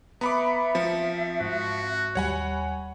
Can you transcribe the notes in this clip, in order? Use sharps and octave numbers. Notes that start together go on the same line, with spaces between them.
B3 E5 A#5 B5 D6 C#7
F3 C4 C#7
G#2 C4 F#4
D#2 G3 C#5 F#5 G#5 B5